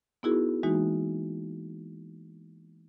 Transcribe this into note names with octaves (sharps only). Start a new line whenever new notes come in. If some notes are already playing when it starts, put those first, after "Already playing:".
B3 D#4 E4 F#4 G#4 A#4
E3 G#3 A#3 D#4 F#4